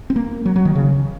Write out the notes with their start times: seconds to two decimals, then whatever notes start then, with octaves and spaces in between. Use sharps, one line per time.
0.10 C4
0.16 A#3
0.45 F#3
0.56 F#3
0.65 D#3
0.75 C#3